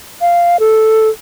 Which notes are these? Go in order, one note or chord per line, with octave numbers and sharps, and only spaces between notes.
F5
A4